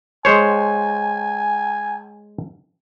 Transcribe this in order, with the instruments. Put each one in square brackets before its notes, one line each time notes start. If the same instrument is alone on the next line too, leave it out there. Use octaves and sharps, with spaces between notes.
[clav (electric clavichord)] G#3 C5 C#5 [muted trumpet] G#5